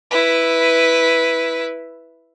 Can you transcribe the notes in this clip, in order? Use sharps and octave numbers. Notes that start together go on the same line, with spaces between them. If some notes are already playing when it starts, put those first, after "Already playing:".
E4 B4